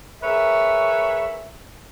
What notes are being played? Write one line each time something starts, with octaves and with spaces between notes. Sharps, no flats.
G#4 A#4 B4 C#5 E5